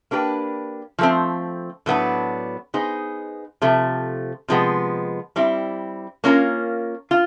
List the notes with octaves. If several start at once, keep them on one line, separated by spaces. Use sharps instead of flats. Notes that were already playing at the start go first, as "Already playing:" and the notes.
A#3 D4 G4 B4
F3 A3 C4
A2 F#3 B3 D4
B3 D#4 G#4 C5
C3 F3 A3
C3 F3 G#3 B3
G3 C4 E4
A#3 C#4 F4 A#4
F4